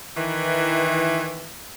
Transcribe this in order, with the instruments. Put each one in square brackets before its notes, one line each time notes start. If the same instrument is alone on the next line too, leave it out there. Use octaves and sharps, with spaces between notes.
[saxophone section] D#3 E3